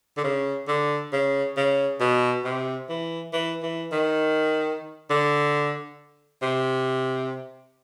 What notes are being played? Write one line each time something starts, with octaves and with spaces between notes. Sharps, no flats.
D3
C#3
D3
C#3
C#3
B2
C3
E3
E3
E3
D#3
D3
C3